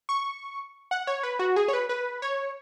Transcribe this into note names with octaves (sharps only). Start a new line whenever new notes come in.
C#6
F#5
C#5
B4
F#4
G#4
C#5
B4
B4
C#5